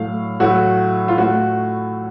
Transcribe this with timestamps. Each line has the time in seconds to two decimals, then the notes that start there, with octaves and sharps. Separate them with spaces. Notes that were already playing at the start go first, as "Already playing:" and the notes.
Already playing: A2 F#3 A3 F5
0.40 A2 F#3 A3 F#4
1.08 F4
1.18 A2 A3 F#4